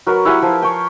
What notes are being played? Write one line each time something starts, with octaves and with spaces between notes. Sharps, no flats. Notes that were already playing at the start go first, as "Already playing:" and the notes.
F#3 F#4 A#4 B4
E4 G4 F#5 G#5
F3
C#5 G5